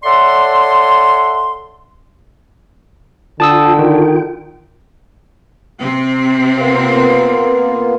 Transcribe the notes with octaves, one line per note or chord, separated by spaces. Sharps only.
A4 C#5 D5 E5 F#5 C6
D3 F4 G5 A5 D#6 E6
D#3
C3 C4
A#3 B3 F4